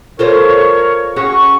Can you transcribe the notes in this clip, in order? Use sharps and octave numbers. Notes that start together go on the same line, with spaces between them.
F4 A4 A#4 C5 C#5
C#4 F#4 G#4 C#6